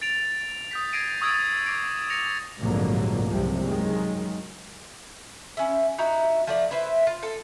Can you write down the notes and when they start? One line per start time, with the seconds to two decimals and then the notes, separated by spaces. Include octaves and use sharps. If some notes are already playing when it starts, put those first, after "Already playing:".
0.01 A6 D7 F7
0.71 D#6 G6 B6
0.93 G#6 A#6 C7 D7 D#7
1.21 C#6 D#6 E6 G#6 A6 D7
1.66 D6 A#6 C7 D7
2.10 A#6 C#7 D7 F7
2.60 F1 A#1 G#2 D3 F#3 A#3
3.28 F#1 C2 C3 F3
3.64 F#2 D#3 G#3
5.57 C#4 E4
5.98 D#4 E4 F#4 A#5
6.47 F3 A3 D5
6.71 E4 B4 C5 E5
7.07 F4
7.23 A4